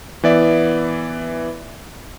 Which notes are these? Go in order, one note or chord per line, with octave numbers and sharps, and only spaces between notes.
E3 B3 D5 E5